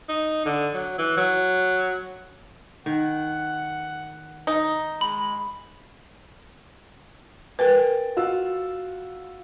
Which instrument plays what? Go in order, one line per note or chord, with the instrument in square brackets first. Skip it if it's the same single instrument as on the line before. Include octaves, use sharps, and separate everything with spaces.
[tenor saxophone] D#4
D3
F#3
E3
F#3
[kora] D#3 [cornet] F#5
[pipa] D#4
[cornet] G#3 [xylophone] B5
[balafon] A#4 B4 [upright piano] G5 G#5 A6
[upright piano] F4 F#4 E6